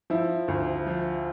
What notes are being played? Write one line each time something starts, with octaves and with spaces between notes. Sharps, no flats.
F3 E4
D2
F3